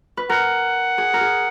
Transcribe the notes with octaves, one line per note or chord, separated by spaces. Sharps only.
B4
A#4 F#5
G#4
A#4
G#4